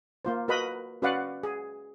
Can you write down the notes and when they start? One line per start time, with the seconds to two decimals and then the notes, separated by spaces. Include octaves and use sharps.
0.25 A#3 F4 C5
0.48 F#4 A#4 B4 D#5 B5
1.02 C#4 F#4 B4 D5 F5 F#5
1.43 G#4